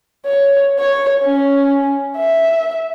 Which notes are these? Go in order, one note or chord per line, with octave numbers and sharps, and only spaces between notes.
C#5
C#5
C#4
E5